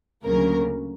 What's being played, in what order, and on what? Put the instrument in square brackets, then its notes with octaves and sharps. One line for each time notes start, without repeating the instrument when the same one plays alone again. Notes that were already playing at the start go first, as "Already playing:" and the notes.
[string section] D2 C#3 F#3 A#3 A#4